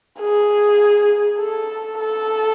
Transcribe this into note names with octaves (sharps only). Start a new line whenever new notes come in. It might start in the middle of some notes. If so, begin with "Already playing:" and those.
G#4
A4
A4